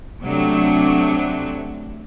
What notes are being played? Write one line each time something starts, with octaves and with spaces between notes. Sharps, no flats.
C3 F#3 A3 D4